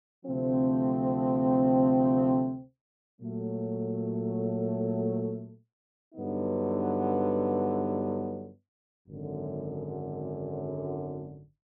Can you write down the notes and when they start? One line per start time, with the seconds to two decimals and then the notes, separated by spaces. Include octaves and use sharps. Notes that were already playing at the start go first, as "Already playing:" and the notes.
0.25 D2 C3 F3 A3 C4
3.19 A#2 F#3 A3
6.13 G2 D3 F#3 B3 D#4
9.08 G#1 F#2 D3